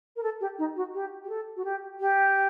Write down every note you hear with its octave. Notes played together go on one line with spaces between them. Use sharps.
A#4
A4
G4
D#4
F#4
G4
G4
A4
F#4
G4
G4